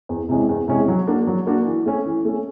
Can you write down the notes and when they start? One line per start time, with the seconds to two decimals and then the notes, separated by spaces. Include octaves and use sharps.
0.09 E2
0.29 C3 E3 G#3 C#4
0.49 E2
0.68 C3 E3 G#3 C#4
0.88 F#3
1.07 A#3 D4 F#4
1.27 F#3
1.47 A#3 D4 F#4
1.67 E3
1.86 A3 C#4
2.06 E3
2.25 A3 C#4